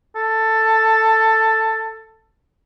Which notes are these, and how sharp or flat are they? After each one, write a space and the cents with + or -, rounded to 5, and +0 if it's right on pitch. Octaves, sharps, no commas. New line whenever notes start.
A4 +10